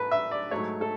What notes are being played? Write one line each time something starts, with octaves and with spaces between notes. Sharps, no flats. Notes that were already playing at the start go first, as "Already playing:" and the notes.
Already playing: A1 A2 A3 B4
E5
D5
G#2 F#3 A3 C#5
A4